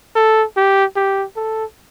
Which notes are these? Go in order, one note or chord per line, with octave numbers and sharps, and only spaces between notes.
A4
G4
G4
A4